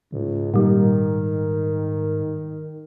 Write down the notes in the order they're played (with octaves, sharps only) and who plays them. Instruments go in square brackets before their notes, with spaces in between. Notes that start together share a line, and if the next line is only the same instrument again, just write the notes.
[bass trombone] C#2 [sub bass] G#2
[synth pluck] A#2 G3 [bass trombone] D#3 [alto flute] A#4